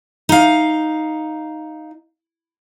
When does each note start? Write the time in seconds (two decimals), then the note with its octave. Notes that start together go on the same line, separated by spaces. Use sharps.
0.29 D#4 F5